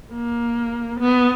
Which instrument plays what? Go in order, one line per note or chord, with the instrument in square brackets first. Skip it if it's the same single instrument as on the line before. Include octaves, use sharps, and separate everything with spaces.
[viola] A#3
B3